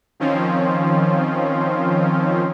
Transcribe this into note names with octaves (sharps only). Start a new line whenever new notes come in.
D#3 F3 C4 C#4 F4